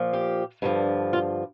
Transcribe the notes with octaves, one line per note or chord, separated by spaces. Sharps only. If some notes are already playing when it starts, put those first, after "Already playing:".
Already playing: A#2 F3
G4
G2 D3 F3
F4